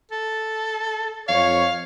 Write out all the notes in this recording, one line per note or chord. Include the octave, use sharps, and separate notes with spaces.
A4
F2 C#5 F5